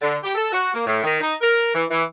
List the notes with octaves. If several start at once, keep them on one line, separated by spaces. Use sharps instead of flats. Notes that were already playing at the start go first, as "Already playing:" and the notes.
D3
G4
A4
F#4
A#3
A2
D#3
D#4
A#4
E3
E3